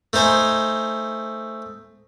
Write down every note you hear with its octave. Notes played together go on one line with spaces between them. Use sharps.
A3 D#4 C5 G#5